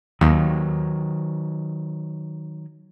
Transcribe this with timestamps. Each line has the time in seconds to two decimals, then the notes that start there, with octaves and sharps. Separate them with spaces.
0.21 D#2 D#3 F#3